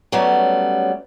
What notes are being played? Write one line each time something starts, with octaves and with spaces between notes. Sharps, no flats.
F#3 G3 A3 B3 C#4